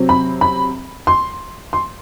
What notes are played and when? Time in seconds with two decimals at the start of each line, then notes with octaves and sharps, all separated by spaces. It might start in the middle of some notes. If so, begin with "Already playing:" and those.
Already playing: C3 F#3 C4
0.09 B5
0.41 B5
1.07 C6
1.73 C6